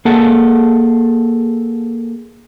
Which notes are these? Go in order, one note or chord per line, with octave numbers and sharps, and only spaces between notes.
A#3 G#4 A4 F#5 A5